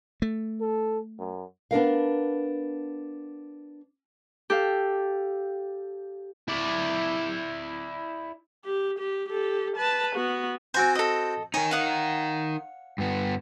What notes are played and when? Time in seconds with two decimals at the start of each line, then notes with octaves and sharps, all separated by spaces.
0.22 A3
0.61 A4
1.19 F#2
1.71 B3 D4 A#4 F5
4.50 G4 A4 F5
6.48 E4 D5
8.65 G4
8.99 G4
9.29 G4 A4
9.77 B4 A5
10.16 B3 F#4
10.74 C4 F#4 C5 G#5
10.95 A4 D#5
11.54 D#4 A#4 C#5 G#5
11.71 F5 F#5 D#6
12.98 G2 B3